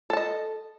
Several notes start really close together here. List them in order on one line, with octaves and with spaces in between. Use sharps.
A4 A5 D#5